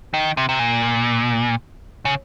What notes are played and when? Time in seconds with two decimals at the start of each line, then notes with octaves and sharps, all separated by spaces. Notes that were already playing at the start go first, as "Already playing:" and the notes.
0.14 D#3
0.37 C3
0.49 C3
0.59 A#2
2.05 C#3